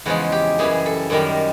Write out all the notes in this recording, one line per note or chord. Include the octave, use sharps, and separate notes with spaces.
E2 C#3 F3 G#3 F#4
G4
F#2 C#3 E3 G3 G#4
A4
F#2 D#3 G3 A#4